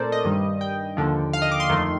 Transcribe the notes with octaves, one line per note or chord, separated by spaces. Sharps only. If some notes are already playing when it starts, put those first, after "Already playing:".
Already playing: A#2 A3 C4 A4 A#4 C5 D5
D#5
G2 D#3 G3
G5
D#2 D3 F3
F5
D#5
D6
C6
F2 D#3 A3